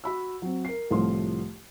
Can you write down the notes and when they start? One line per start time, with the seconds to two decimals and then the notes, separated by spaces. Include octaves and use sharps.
0.04 F#4 B5 E6
0.42 F#3 C4
0.65 A#4 C7
0.90 C2 A2 F3 A3 F4 C6